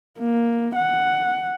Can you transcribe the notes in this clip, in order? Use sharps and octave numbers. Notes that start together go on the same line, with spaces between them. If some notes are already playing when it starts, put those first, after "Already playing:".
A#3
F#5